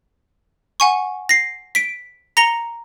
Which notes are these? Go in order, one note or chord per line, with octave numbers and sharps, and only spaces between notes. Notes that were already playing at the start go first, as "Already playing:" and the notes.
F#5 G#5 C#6
A#6 C7
B6 D7
A#5 A#6 C#7 F7 G7